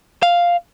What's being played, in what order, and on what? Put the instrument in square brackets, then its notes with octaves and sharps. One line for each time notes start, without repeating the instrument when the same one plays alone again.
[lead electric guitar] F5